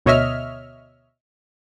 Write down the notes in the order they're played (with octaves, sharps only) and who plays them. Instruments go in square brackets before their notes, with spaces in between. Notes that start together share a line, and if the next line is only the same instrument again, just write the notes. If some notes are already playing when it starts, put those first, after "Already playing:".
[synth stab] D2 B2 C#5 D#5 E5 F6